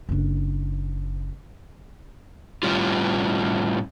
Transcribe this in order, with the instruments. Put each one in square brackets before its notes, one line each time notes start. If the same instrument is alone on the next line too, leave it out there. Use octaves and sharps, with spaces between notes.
[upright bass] F#1 D4
[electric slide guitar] A2 G3 C#4 F4